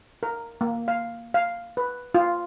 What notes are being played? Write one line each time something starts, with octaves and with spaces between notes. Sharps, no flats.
A#4
A#3
F5
F5
B4
F4